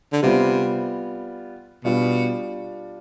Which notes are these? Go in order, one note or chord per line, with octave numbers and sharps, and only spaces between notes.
D3
C3 G3 B3 F4
B2 G3 D4 F4